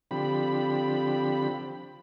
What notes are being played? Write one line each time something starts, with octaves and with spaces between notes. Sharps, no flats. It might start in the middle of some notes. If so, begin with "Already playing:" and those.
D3 F3 C4 G4 B5